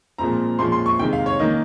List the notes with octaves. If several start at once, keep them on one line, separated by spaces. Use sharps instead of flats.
A#2 F3 G#3 C4 A#5
A#2 F3 G#3 C#4 C6
C6
C#6
C3 D#3 G#3 G5
F5
C#5
D#3 A#3 C#4 D#5